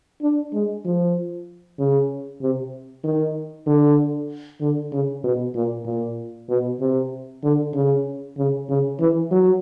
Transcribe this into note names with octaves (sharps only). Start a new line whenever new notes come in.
D4
G#3
F3
C#3
C3
D#3
D3
D3
C#3
B2
A#2
A#2
B2
C3
D3
C#3
C#3
C#3
E3
F#3